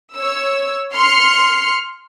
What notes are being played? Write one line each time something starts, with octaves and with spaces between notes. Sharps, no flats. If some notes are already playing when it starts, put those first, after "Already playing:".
C#5 E6
C6 F6 C7 C#7